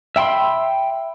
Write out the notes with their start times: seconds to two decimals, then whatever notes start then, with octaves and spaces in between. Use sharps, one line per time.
0.16 E5 G5 B5 C6